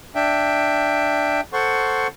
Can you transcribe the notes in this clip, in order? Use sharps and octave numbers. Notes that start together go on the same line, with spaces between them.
D4 E5 G5
A4 C5 F#5 C6 C#6